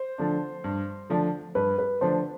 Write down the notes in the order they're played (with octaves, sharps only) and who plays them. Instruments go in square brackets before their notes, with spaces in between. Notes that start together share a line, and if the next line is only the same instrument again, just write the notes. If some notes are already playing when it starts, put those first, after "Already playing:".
Already playing: [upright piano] C5
[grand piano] D3 F3 A3 D4
G2
D3 F3 A3 D4
[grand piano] G2 [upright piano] B4
[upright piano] B4
[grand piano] D3 F3 A3 D4 [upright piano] C5